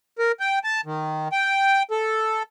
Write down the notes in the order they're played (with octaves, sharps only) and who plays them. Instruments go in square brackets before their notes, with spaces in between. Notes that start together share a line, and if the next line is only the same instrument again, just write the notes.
[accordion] A#4
G5
A5
D#3
G5
A4